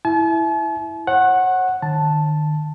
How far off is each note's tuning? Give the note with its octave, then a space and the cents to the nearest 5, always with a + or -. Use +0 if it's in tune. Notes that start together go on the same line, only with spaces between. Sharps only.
E4 +0 A5 -45
C#5 -40 F#5 +0
D#3 -40 A5 +0